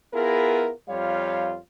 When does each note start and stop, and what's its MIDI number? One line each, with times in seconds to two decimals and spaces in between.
0.14 0.71 59
0.14 0.71 64
0.14 0.71 65
0.14 0.71 68
0.14 0.71 70
0.89 1.57 41
0.89 1.57 55
0.89 1.57 65
0.89 1.57 73
0.89 1.57 77